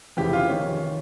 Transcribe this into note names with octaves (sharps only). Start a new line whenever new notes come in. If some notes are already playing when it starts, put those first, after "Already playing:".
F1 F2 C#3 E3 G4
F4
D#3 C#4